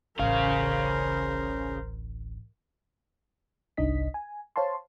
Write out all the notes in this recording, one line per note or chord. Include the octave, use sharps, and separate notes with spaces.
D1 A1 C#3 A#4 C5 F5
G1 C2 D4 D#4 D#5 B6
G#5
C5 C#5 F5 A5 C6